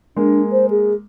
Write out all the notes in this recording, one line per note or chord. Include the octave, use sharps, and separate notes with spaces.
G#3 A#3 D4
C5
G#4